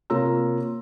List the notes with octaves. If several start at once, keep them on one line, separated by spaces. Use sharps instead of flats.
C3 A#3 F4 C#5 A#5 E6